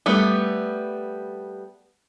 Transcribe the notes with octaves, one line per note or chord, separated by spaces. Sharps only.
G3 A3 B3